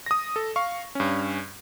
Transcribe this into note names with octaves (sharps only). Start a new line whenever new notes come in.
D#6 A#6
A4
F5 C#6
G2 C#4